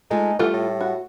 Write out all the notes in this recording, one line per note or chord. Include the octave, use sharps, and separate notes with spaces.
G#3 A3 D#4 F4
E3 G3 A3 F4
A2
F#4